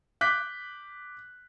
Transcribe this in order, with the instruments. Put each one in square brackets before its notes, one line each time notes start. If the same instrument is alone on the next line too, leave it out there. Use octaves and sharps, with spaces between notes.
[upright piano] D6 F#6 G6 B6